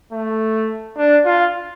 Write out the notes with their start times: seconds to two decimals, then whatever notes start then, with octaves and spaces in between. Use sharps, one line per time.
0.12 A3
0.97 D4
1.26 F4